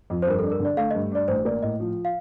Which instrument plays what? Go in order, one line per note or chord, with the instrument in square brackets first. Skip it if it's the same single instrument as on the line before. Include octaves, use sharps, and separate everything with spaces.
[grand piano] F2
[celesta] C5
[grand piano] G2 [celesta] A#4
[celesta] A4
[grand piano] D4
[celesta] A#4
[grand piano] D3 [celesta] D5
[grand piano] A3 [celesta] F5
[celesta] D#5
[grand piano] G2
[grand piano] D4 [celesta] D5
[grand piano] A1 [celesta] C5
[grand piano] A#3 [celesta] D5
[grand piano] A2 [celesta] D#5
[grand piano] F3
[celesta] F5